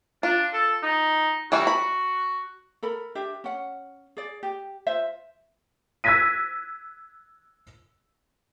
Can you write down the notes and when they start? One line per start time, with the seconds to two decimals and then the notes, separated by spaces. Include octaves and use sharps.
0.23 D4 F4
0.53 A4
0.83 D#4
1.52 E3 G3 E4 F#4
1.67 B5
2.83 A4 A#4 B5
3.15 D4 G4 E5
3.44 C#4 F#5
4.17 G#4 D5
4.43 G4
4.87 F4 C5 E5
6.04 E6 F#6 G#6 A#6 B6 D#7